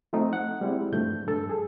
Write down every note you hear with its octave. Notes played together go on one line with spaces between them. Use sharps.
F3 A3 C4 D#4
F#5
G3 G#3 C4 E4
G2 F3 A3 G6
G2 A4 A5
G#4 A4